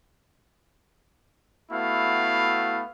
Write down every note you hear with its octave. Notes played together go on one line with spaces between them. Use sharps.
A3 B3 E4 F#4 F5